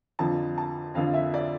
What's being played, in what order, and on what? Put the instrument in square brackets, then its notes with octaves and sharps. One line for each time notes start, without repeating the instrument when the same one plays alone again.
[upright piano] F2 D3 F3 A5
A5
F2 D3 F3 F5
E5
D5